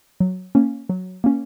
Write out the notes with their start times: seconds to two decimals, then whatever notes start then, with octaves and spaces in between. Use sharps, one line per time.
0.20 F#3
0.55 A#3 C#4
0.89 F#3
1.24 A#3 C#4